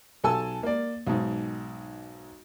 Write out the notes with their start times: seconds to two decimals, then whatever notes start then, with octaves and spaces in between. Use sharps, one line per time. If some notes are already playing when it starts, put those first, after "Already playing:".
0.24 B1 A4 G#5 A5 E6
0.63 A#3 D5
1.07 B1 G#2